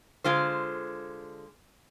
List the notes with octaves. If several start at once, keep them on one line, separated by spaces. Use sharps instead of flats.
D3 G#3 F4 C5